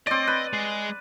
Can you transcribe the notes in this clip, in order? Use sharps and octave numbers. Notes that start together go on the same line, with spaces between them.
C4 D5 D#5
B4
G#3